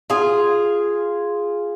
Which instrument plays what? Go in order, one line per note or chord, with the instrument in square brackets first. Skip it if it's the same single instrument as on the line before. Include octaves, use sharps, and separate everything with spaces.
[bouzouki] F4 G#4